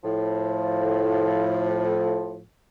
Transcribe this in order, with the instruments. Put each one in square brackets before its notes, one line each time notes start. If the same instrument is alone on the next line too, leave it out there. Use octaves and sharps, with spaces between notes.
[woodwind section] A2 F3